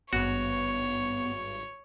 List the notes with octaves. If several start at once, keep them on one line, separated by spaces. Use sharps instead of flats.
G#1 G2 B3 F#4 C#5